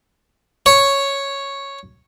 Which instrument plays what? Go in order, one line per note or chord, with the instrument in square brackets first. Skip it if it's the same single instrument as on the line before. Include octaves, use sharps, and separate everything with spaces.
[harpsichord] C#5